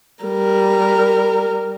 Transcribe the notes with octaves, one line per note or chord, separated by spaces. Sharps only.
G3 A#4